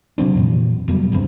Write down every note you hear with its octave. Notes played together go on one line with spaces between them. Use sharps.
C3 F#3 C4 D4
F2 A#2 E3
F2 B2 F#3 G3
E1 G2 C#3 C4